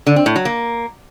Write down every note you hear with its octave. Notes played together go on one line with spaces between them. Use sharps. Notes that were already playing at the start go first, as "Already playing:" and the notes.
D3
C4
A2
F#3
A#3